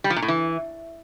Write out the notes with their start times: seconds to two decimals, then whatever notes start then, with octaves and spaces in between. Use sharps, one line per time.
0.04 G3
0.10 F3
0.16 A#2
0.22 A2
0.28 E3